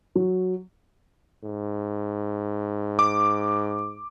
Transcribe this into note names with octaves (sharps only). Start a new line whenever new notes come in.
F#3
G#2
D6